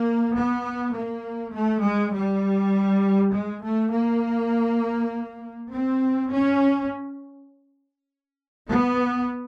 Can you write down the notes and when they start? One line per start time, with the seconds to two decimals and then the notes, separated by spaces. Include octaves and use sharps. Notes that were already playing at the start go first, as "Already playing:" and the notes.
Already playing: A#3
0.36 B3
0.95 A#3
1.54 A3
1.84 G#3
2.14 G3
3.33 G#3
3.63 A3
3.93 A#3
5.71 C4
6.32 C#4
8.70 B3